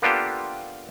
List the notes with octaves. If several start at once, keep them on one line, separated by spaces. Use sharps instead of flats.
A#3 B3 D4 F4 G4 A4